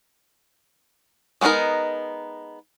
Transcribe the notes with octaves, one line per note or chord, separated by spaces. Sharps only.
G#3 B3 C#4 D#4 A#4